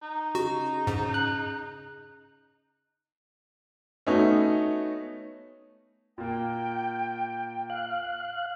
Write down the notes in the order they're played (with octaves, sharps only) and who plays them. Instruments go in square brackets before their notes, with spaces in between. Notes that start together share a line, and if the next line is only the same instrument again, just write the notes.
[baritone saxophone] D#4
[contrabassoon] C#3 [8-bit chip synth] F#4
[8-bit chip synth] G#2 [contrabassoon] C#3
[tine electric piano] F#6
[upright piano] A3 B3 C#4 D#4 F#4
[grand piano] A#2 A#3 [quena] G5
[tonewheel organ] F5 F#6